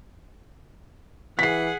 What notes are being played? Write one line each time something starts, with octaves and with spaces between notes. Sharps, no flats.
E3 G#4 F#5 B6 C7